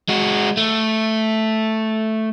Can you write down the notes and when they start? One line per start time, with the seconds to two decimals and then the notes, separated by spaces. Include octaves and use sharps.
0.09 G#3 F#4
0.57 A3